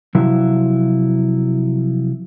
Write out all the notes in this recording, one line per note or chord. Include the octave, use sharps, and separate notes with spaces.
C3 F3 F#3 E4